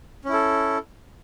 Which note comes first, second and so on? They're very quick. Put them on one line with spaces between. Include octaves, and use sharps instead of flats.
C#4 E4 A4